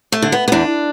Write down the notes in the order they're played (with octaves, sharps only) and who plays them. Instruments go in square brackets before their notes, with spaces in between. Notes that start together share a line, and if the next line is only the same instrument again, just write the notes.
[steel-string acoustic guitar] A3
D3
B3
B3
E2 D4